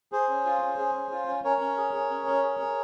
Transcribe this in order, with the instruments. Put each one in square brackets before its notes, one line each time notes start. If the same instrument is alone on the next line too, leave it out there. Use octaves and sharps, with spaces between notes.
[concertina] G#4 C5
C#4
F4
C#4
G#4
C#4
F4
C#4
C#4 A#4 C#5
C#4
G#4
G#4
C#4
C#4
G#4
G#4